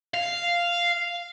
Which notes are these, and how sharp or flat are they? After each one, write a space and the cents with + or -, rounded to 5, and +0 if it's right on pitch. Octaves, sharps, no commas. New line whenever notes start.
F5 -5